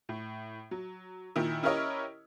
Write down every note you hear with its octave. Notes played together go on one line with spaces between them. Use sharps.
A2
F#3
A#2 D#3 E4
C#4 E4 G4 A#4 C#5 D#5